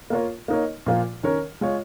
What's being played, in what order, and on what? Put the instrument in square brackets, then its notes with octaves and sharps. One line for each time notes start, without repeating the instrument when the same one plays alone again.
[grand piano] A#3 F4 A#4 C#5
A#3 D#4 A#4 C#5
A#2 F3 A#3 F4
D#3 C#4 A#4 C#5
G#3 F4 C#5